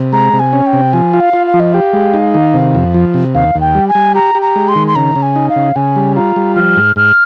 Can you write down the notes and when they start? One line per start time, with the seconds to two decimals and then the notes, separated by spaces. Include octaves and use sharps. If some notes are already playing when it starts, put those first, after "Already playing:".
Already playing: C3
0.13 G#3 A#5
0.33 C3
0.39 G#5
0.53 C#4
0.67 G5
0.73 C3
0.93 F3 G#5
1.13 F4
1.20 F5
1.33 F4
1.47 F5
1.54 F3
1.60 D#5
1.73 G4 F5
1.93 G#3
2.14 D#4
2.34 D#3
2.54 C3
2.75 F2
2.94 F3
3.14 C3
3.35 D#2 F5
3.55 D#2
3.61 G5
3.75 G3
3.88 G#5
3.95 G3
4.15 G4 A#5
4.35 G4
4.42 A#5
4.56 G#3
4.68 C6
4.76 D#3
4.88 C6
4.96 C#3 A#5
5.16 C#3
5.22 G#5
5.36 D#4
5.49 F5
5.56 C#3
5.76 C#3 G#5
5.96 G3
6.16 F4 A#5
6.36 G3
6.56 F3 F6
6.77 G#2
6.96 G#2 F6